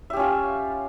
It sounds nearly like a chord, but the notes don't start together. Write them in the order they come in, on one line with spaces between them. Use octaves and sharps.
E5 G4 C#4 F4